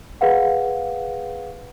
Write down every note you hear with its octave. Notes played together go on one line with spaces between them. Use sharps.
G#4 B4 F5 F#5